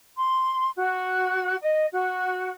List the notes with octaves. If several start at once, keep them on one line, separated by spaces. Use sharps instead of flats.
C6
F#4
D#5
F#4